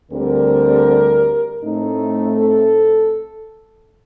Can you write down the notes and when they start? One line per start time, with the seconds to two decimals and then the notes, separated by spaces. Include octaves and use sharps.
0.11 D2 D3 G3 C4 A#4
1.63 A2 A3 C4 D#4
2.38 A4